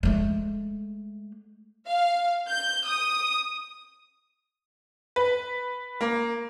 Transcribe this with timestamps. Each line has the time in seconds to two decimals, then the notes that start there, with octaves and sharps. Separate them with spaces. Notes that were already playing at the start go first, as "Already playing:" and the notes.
0.03 G#3 A3
1.88 F5
2.50 G6
2.88 D#6
5.16 B4
6.01 A#3